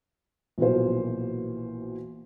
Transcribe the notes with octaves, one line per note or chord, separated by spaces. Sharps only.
A#1 B2 E3 F#3 A#3 C5